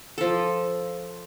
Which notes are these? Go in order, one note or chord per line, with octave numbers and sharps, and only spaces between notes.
F3 A4